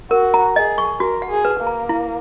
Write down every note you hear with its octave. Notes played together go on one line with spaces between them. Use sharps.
F#4 A#4
A#5
G#4 D#5
C#6
F#4 A#4
F#5
G#4
B4
A#3
A#5
E4